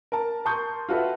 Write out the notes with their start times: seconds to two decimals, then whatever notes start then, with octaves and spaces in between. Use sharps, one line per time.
0.12 A#4 A5
0.45 A#4 A5 C6 C#6 D#6 G6
0.89 F4 F#4 A4 B4 E5